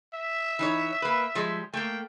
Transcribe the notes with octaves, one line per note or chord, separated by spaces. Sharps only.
E5
E3 D#4 C#5
A#3 B4
F3 G3 G#3
A3 A#3 G5